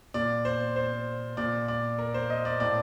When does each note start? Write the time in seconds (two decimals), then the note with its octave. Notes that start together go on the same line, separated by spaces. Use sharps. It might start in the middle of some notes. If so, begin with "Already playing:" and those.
0.14 A#2 D5
0.45 C5
0.76 C5
1.37 A#2 D5
1.68 D5
1.99 A#4
2.14 C5
2.30 D#5
2.45 D5
2.60 A2 D5